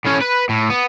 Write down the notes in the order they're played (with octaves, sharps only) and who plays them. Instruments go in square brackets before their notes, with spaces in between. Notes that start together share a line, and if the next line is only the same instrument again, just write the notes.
[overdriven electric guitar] A2 C#4
B4
A2
B3